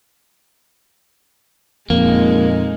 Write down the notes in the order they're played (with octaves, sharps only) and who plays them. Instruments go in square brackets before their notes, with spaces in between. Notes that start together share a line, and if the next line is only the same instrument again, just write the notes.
[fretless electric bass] F2 A#2 [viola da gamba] G#3 D#4 [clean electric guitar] A#3